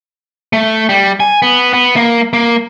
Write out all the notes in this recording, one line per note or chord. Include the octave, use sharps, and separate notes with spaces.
A3
G3
G#5
B3
B3
A#3
A#3